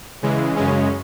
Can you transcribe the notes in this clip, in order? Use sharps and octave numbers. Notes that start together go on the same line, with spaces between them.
C#3 E3 G#3
F#2 C#3 G#3 C#4